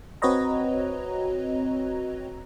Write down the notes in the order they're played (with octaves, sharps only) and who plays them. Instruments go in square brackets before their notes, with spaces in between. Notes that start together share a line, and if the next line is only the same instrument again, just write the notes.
[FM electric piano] C4 F#4 B4 C#5 D#5 A#5